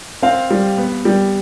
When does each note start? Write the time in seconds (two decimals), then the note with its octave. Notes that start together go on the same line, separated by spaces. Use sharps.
0.22 C4 F5
0.51 G3
0.78 B3
1.05 G3